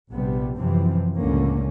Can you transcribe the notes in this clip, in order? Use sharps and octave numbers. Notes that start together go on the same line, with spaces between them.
A#1 C3 G3 B3
F#2 C3 E3 F3 C4
C#2 A2 D3 A#3 C#4